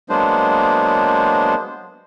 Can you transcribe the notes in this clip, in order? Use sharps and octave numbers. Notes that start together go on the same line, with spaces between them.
F#3 G#3 A#3 B3 D4 C5